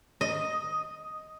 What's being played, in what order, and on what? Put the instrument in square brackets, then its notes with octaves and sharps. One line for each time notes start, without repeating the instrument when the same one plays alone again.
[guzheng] D#5